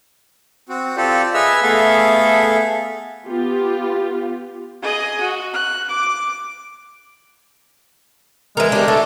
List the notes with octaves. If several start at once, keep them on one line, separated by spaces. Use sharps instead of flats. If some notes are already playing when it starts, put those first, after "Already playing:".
C4 F#4
C4 F4 G4 A4 C5 D5
G#4 B4 D#5 E5 E6 F6
A3 B3 G#4 A4 E5 F5
B3 F4 G4
G#4 D#5
F#4
F#6
D6
E3 G#3 A#4
D4 G4
A3 A4